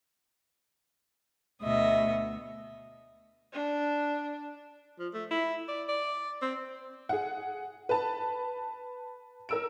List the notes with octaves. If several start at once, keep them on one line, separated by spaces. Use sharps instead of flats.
D2 B2 D#5 E5
D4
F3
A3
E4
D5
D5
C4
G#4 F#5
B4 A5
A#4 E6 D7